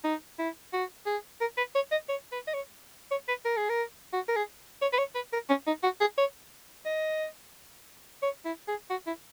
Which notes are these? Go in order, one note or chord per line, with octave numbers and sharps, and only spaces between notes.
D#4
E4
F#4
G#4
A#4
B4
C#5
D#5
C#5
B4
D#5
C#5
C#5
B4
A#4
G#4
A#4
F#4
A#4
G#4
C#5
B4
C#5
B4
A#4
C#4
D#4
F#4
G#4
C#5
D#5
C#5
E4
G#4
F#4
E4